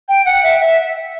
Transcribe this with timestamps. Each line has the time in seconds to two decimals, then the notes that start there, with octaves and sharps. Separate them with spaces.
0.09 G5
0.25 F#5
0.43 E5
0.61 E5